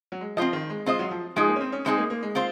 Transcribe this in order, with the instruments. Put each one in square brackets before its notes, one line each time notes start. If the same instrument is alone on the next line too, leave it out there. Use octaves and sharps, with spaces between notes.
[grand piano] F#3
G#3
[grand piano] F3 [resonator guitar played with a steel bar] C4 F4 C5 D#5
[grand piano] D#3
G#3
[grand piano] G#3 [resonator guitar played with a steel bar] C4 F4 C5 D#5
[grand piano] F#3
F3
[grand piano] F3 [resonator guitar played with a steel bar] G#3 D#4 G#4
[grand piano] A#3
C#4
C4
C#4
[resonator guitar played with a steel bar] G#3 D#4 G#4 [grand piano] C4
[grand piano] A#3
A#3
G#3
[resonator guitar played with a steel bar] C4 F4 C5